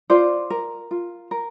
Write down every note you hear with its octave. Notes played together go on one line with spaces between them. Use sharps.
F4 C5 D5
A#4
F4
A#4